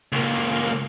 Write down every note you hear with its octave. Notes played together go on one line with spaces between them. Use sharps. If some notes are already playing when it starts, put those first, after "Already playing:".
C#2 A#3